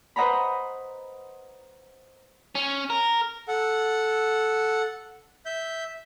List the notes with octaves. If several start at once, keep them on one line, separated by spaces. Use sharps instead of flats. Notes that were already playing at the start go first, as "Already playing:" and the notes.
B4 C5 D#5 F#5 A#5 B5
C#4
A#4
A4 F#5
E5 G6